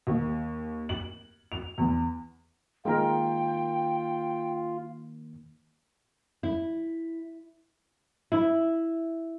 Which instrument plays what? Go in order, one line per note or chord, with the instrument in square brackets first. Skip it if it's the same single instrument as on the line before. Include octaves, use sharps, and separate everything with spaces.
[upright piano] D#2
F#7
F7
E2
[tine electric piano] D#3 A#3 [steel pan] G#3 A#4 [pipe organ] F4 [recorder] G5
[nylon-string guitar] E4
[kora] E4